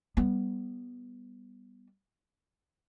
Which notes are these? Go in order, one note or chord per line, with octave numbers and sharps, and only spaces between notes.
G3 B3